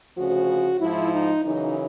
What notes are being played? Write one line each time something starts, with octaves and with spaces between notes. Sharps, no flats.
D2 C#3 F3 F#4
G#2 F3 E4
D#4
F#2 C#3 E3 D#4